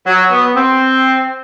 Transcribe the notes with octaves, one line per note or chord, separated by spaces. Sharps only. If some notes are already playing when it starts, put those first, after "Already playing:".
F#3
B3
C4